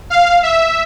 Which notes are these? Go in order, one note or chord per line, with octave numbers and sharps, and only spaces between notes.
F5
E5